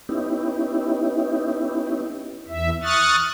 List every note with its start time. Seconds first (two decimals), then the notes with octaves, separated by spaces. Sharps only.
0.09 B3 C#4 D#4 E4 G4
2.48 E2 E5
2.83 C#6 D#6 F6 F#6 A6